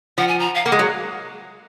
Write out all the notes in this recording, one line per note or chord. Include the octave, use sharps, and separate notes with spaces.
F3 F#5
G#5
A#5
F5
A#3 F#5
G#3
F#3